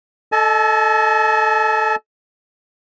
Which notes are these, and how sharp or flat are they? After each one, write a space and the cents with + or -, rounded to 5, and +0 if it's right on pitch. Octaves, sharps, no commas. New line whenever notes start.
A4 +0 D#5 +0 A5 -45